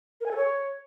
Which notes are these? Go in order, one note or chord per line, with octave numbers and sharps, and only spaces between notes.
A#4
G#5
A4
C#5